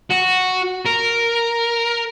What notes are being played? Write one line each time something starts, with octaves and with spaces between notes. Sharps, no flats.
F#4
A#4